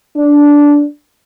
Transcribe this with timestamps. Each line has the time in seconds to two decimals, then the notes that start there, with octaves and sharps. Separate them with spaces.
0.17 D4